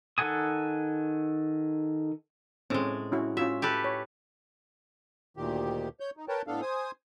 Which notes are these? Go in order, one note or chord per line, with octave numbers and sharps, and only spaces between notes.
D#3 A4 F#5 G#5 D#6
A2 G#3 C4 C#4
C#4 E4 F#4
C#4 F4 F#4 E5
G4 A4 B4
C#5
D2 A#2 D#3 G4
C#5 G6
D#4
A#4 B4 C#5 G5 A5
A2 B3 D4 A4 F5
C5 G#5 D#6